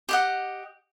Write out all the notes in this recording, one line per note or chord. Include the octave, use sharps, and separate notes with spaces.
G4 D#5 F#5